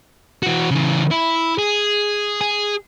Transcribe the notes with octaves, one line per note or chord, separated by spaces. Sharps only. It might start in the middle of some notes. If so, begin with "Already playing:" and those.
E3 F#4
C#3 E3
E4
G#4
G#4